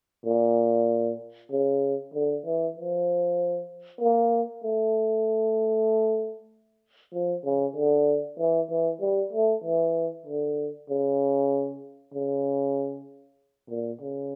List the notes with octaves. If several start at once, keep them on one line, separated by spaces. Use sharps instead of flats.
A#2
C#3
D3
E3
F3
A#3
A3
F3
C#3
D3
E3
E3
G3
A3
E3
D3
C#3
C#3
A#2
C#3